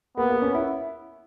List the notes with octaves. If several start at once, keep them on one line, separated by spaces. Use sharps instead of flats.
A#3 B3
A#3
C#4
E4